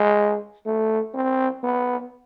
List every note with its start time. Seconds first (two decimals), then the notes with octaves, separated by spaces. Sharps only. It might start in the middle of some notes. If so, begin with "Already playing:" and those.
Already playing: G#3
0.66 A3
1.14 C4
1.63 B3